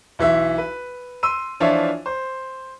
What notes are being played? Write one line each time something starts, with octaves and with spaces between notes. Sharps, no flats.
B1 E3 E5
B4
C6 E6 D#7
E3 F3 D4 F4 C#5 E5
C5